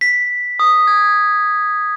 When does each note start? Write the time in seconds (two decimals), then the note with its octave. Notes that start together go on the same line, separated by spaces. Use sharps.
0.01 B6
0.59 D#6
0.87 G#6